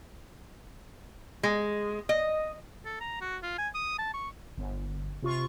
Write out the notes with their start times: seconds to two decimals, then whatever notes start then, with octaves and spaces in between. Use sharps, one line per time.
1.43 G#3
2.09 D#5
2.85 A4
3.00 A#5
3.21 F#4
3.43 F4
3.58 G#5
3.74 D#6
3.98 A5
4.13 C#6
4.57 G1
5.22 C3 F4 C#6